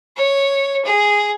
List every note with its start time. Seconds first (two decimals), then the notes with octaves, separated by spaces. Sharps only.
0.17 C#5
0.85 G#4